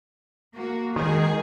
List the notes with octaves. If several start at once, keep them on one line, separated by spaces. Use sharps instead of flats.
A#3 F#4
D#3 G#3 G#4